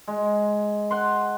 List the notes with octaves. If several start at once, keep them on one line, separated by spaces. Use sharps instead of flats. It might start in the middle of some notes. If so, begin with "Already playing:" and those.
G#3
F#5 C6